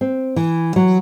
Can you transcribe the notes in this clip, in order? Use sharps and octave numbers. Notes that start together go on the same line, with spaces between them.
C4
E3
F#3